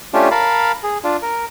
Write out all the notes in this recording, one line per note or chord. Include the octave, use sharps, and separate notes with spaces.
A3 C#4 D4 F4 G4
A#4 F5 A5 B5
G#4
D4 F4
A#4